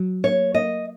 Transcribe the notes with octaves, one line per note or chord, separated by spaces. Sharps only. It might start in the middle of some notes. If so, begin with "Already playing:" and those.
Already playing: F#3
A#3 C#5
A#3 D#5